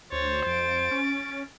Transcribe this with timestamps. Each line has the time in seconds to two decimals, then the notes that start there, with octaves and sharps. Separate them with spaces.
0.12 D2 C5 C#5 A6
0.46 F2 A6 D7
0.91 C#4